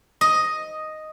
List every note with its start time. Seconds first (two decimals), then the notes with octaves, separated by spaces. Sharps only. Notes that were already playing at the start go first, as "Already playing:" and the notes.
0.21 D#5